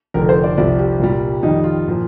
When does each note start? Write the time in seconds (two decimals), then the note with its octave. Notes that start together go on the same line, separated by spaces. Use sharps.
0.14 F1 F2 D3 A#4
0.29 C5
0.44 D5
0.57 C2 C3 F3 D5
0.79 G4
1.00 C2 A#2 G3
1.43 F2 D#3 G3 D#4
1.64 F4
1.88 A#2 F3